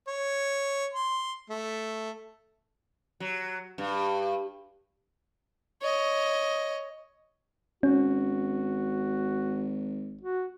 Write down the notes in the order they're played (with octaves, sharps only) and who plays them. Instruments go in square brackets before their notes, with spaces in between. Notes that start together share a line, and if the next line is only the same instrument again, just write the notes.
[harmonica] C#5
C6
A3
[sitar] F#3
G2
[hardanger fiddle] C#5 D#5
[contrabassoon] G#1 [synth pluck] C#4 [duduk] F#4
[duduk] F#4